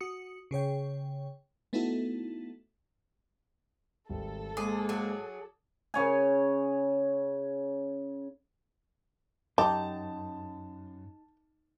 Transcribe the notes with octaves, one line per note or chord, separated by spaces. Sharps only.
F#4 D#6 C#7
C#3 G#4 C#5 G5
A3 B3 D#4 E4 F#4 A4
G#1 G3 A4
G#2 G#3 A#3 G#4 G#5 D6 D#6
F#3 G#4
C#3 C#5 G#5
F#2 D#4 G4 A5